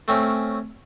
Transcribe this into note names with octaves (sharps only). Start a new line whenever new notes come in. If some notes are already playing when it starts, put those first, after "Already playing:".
A3 C4 C#4